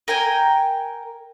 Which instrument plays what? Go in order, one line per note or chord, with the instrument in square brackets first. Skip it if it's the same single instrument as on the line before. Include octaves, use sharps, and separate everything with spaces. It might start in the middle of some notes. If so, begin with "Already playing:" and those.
[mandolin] A#4 G5 G#5